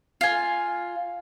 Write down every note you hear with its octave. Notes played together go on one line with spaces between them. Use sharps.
F4 G#5